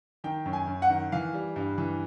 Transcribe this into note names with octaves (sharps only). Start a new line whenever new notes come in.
D#3 G5
F#2
G#5
F#2
F#5
D#3
E3 F5
G3
G2
E3